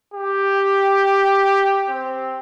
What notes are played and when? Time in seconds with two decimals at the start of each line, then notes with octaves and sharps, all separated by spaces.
0.14 G4
1.90 C4